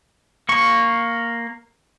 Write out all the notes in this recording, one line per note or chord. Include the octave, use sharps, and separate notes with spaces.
A#3 C#6